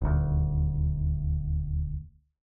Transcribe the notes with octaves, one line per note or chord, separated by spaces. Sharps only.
D#1 D2